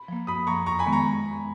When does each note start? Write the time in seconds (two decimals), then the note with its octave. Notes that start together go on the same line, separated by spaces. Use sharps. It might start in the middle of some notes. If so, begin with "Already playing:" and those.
Already playing: B5
0.08 F3 A#3
0.27 F#2 B5 D#6
0.47 F3 A#3 A#5 C#6
0.66 F2 A#5 C#6
0.79 G#5 B5
0.86 D#3 G#3 B3
0.93 A#5 C#6